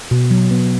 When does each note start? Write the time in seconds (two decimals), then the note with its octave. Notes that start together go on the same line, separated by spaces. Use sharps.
0.11 B2
0.31 F#3
0.51 B3